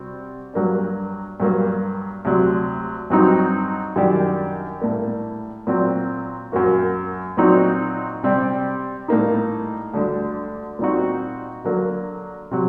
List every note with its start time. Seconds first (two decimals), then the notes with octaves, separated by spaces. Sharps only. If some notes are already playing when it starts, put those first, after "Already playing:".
Already playing: C3 G3 C4 F#4
0.54 G2 F#3 A#3 D4
1.40 G2 F#3 A#3
2.25 D2 C3 F#3
3.10 G2 F#3 C4 D#4 F#4
3.96 F#2 D#3 G3 D4 G4
4.81 A2 G3 A#3
5.67 A#2 F#3 C4
6.52 F#2 F#3 A#3 F#4
7.37 A#2 F#3 C4 D#4 F#4
8.23 C3 G3 C4 G4
9.08 A2 G3 A#3 D#4
9.94 D2 D3 G3 D4
10.79 A#2 G3 C4 D#4 F#4
11.64 D3 F#3 A#3
12.51 C3 F#3